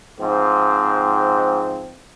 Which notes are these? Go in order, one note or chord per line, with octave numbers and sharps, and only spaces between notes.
G#2 F3 C4